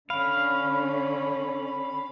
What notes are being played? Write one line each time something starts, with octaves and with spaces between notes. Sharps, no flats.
D3 C#4 F5 B5